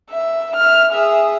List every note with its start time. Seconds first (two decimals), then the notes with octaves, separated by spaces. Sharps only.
0.11 E5
0.57 E5 F6
0.93 G#4 E5